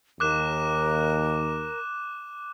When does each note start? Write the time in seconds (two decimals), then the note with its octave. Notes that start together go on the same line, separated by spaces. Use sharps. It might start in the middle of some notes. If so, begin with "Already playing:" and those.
0.20 D#2 A#4 D6 F#6 E7